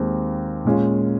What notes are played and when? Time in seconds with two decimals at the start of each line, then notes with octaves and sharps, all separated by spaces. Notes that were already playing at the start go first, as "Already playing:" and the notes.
Already playing: D#2 D#3 G#3 C4
0.65 A#2 G#3 C#4 F4